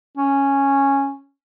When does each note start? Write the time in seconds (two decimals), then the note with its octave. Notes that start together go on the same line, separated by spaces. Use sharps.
0.17 C#4